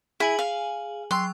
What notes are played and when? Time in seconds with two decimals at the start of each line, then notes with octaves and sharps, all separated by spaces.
0.20 E4 G#4 G#5 F#7
0.39 F5
1.11 F#3 G5 C6 E6